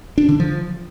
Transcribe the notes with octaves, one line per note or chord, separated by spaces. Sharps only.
D4
D3
F3